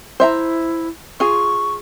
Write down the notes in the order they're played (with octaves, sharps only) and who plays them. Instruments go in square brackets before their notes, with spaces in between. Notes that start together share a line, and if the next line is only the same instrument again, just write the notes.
[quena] E4 [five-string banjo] C5 E5 A#5
[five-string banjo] F4 G#4 [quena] C#6